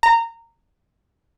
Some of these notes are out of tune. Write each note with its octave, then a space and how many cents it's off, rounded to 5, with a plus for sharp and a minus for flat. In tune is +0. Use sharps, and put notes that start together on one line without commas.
A#5 -20